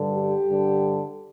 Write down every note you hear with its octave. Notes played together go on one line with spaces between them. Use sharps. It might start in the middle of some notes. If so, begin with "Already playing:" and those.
Already playing: G2 D3
G4
G2 D3